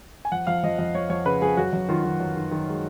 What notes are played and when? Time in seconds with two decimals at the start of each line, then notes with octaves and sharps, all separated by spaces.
0.25 G#5
0.32 F2 F#5
0.47 F2 F5
0.64 F2 D#5
0.78 F2 D#5
0.95 F2 C#5
1.10 F2 C#5
1.25 C#3 B4
1.42 F2 G#4
1.57 F#2 F#4
1.73 F#2
1.88 D#3 F4
2.04 D#3
2.20 F#2
2.36 D#3
2.51 D#3
2.68 G#3